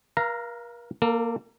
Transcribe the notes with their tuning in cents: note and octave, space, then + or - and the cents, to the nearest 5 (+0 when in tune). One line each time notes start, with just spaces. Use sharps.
A#4 +40 F5 -20 A#5 +0
A#3 +0 A4 +45